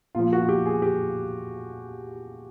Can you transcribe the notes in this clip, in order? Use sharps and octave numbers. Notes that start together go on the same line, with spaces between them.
A#2 F3 F4
F#4
G4
G#4
G4